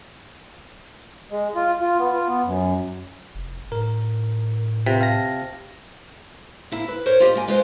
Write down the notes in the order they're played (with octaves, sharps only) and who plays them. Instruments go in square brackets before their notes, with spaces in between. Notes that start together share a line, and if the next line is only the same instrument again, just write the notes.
[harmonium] G#3
F4
F4
B3
F4
B3
F#2
[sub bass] F1
[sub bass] A2 [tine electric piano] A#4
[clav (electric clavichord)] C3 [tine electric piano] F4 B4 B6
[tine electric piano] F5 A5 A#6
[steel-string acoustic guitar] A#3 E4
B4
A#4 C5 C#5
F4 G4 D#5
A#3 G#5
G#3 F4 B4 C5 D#5 F5